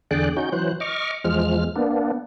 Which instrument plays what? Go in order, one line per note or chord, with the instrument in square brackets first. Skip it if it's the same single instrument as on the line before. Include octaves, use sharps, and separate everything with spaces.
[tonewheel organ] E2 D3 G#4 D5 G5 F#6
C#4 D#4 F#4 G6
E3 F#3 C5 F#6
D#5 C#6 D6 F6
E2 F3 G#3 F6
A#3 B3 D4